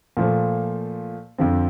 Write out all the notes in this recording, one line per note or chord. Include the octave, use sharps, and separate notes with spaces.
A#2 F3 A3
F2 D3 F3 C4